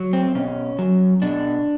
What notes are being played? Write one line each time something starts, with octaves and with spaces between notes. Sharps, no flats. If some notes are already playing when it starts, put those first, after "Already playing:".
Already playing: F#3
C4
B2 C#4
F#3
B2 D4